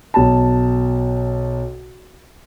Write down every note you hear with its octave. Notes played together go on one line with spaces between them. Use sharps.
B1 A5